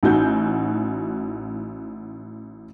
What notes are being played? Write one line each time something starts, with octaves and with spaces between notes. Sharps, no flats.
A1 D#4 F#4 G6